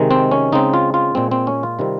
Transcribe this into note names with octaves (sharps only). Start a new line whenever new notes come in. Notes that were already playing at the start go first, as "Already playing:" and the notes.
Already playing: C3 D#3 G#3
C4
C#4
C#3 G#3 C4 D#4
F4
F4
A#2 G#3 C4
C4
C#4
F4
C3 D#3 G3 C4